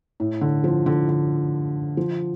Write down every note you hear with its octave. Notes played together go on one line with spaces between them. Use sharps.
A2
D3
F3
D3
D3
F3